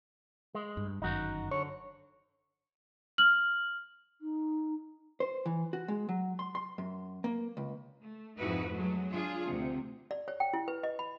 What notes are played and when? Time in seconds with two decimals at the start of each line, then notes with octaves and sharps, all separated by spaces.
0.55 G#3
0.77 G2
1.02 G1 F#2 D#3 D#4 F#4
1.51 D3 C#5
3.18 F6 F#7
4.21 D#4
5.20 C5
5.46 E3
5.73 F#4
5.88 G#3
6.09 F#3
6.39 C6
6.55 C6
6.78 F#2
7.24 A#3
7.57 C#2
8.01 A3
8.38 F2 G#2 D#4 E4 F#4 B4
8.72 F#3 G#3 A3
9.11 D4 F4 G#4
9.48 D2 C3
10.11 D5
10.28 C#5
10.40 G5
10.54 E4
10.68 B4
10.83 D#5
10.99 B5